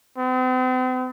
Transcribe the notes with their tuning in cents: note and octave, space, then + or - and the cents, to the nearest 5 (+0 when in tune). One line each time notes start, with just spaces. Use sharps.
C4 -45